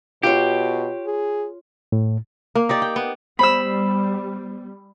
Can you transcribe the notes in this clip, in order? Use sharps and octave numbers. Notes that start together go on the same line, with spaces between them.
B2 F4 G4 C#5
G#4
A2
A#3
D#4 G4 D5
G5
B3
G3 B3 C5 B5 E6